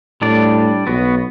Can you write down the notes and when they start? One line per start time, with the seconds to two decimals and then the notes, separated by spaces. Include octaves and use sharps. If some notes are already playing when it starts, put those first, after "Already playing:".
0.22 A2 G3 D4 D5
0.87 B1 B3 F#4